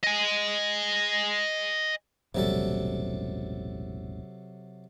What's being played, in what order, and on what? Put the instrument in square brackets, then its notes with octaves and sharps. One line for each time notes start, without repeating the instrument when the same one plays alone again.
[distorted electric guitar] D#5 G#5
[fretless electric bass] E1 A1 G3 [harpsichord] C3 F#3 A4